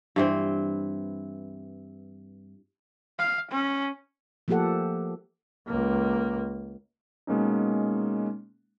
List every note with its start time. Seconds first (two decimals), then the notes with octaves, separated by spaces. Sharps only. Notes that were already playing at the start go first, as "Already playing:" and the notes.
0.16 G2 E3 C4
3.19 F5
3.51 C#4
4.48 F3 A3 A#3 G4 A4 F#5
5.67 C#2 A#3
7.27 B2 G#3 A#3 C#4 D#4